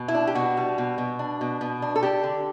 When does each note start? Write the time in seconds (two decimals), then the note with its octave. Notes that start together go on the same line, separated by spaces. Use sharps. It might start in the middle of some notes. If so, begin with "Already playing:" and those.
Already playing: B2
0.08 E4
0.15 D4
0.27 G4
0.35 B2 F#4
0.57 G3
0.78 B2
0.98 B2
1.19 D4
1.41 B2
1.61 B2
1.82 D4
1.96 A4
2.03 D4 G4
2.23 D3